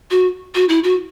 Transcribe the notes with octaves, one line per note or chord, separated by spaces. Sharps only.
F#4
F#4
E4
F#4